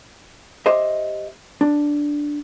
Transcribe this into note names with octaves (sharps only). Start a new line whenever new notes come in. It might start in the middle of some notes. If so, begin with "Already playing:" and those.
G4 C5 D#5 E5
D4